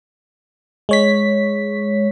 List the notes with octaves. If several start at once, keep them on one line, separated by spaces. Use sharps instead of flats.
G#3 C#5 B6